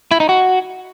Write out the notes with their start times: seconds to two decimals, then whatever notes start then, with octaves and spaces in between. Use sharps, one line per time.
0.11 E4
0.20 D#4
0.29 F#4